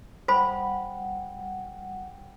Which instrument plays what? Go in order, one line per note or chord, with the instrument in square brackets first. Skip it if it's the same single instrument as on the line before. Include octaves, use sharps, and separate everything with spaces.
[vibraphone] G3 F#5 [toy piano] C5 B5